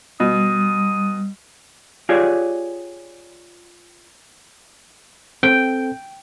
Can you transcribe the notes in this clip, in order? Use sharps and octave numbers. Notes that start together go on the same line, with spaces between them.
B2 G3 D#6
F4 G4 G#4 C#5 D5
C4 A4 G5